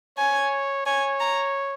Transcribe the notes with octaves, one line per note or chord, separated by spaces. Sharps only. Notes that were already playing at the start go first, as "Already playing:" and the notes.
C#5 G#5
C#5 G#5
A#5